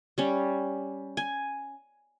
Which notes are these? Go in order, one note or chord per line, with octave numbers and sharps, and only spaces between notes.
G3 C#4
G#5